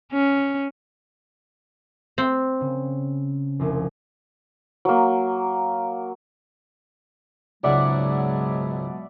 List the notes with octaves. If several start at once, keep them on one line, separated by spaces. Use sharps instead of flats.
C#4
C4
C#3
F1 C2
F#3 A#3
C#2 G#2 B2 F#3 G#3 D5 E5 F#5